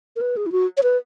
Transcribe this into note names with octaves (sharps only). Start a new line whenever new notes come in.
A#4
B4
G#4
E4
F#4
C#5
B4